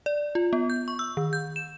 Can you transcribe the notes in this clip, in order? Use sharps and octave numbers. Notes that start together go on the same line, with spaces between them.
D5
F4
B3
G6
C#6
E6
D#3
G6
E7